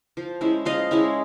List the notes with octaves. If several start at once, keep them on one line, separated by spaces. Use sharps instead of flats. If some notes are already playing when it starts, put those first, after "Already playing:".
F3
G#3 C#4 E4
F3 D#5 F5
G#3 C#4 E4